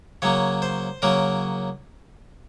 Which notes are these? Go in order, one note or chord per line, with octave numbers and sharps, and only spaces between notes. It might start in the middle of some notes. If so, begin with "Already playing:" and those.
C#3 F#3 A#3 C#5
C5
C#3 F#3 A#3 A#4